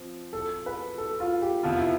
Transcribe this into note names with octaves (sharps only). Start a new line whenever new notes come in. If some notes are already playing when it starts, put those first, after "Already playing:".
Already playing: F3 C4
A4
B4
A4
F4
G4
F2 C3 F3 B3 F4
E4